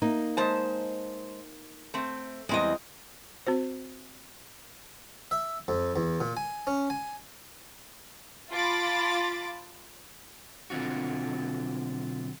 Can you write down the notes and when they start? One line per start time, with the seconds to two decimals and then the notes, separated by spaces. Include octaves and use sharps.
0.02 A#3 D#4
0.37 G#3 C5 A5
1.94 A3 C4
2.49 E2 G3 G#3 C4 D#5
3.47 C4 F#4 C5
5.31 E5
5.68 F2
5.96 E2
6.21 A#2
6.37 G#5
6.67 C#4
6.90 G#5
8.50 F4 A5 B5 D6 A6
10.70 B1 D3 C4 F4 F#4